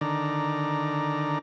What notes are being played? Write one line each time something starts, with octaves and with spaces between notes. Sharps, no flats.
D3 D#3 D5 A#5